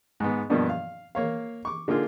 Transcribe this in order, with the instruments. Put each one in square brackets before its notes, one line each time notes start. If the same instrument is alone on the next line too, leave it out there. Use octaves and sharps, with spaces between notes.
[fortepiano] G#2 B3
G2 B2 F3 A#3 B3 D4
F5
A#3 C#5 F5
C#6 D6
D3 A#3 D#4 F4 G#4